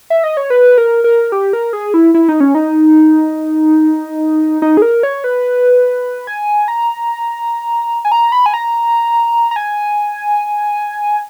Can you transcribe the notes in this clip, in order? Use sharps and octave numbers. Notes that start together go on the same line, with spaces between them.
E5
D#5
C#5
B4
A#4
A#4
G4
A#4
G#4
E4
E4
D#4
C#4
D#4
D#4
G#4
A#4
C#5
B4
G#5
A#5
G#5
A#5
B5
G#5
A#5
A#5
G#5